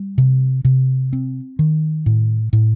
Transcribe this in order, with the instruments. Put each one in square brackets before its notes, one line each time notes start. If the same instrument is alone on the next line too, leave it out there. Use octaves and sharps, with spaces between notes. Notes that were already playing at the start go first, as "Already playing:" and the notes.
Already playing: [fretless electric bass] G3
C3
C3
C4
D#3
A2
A2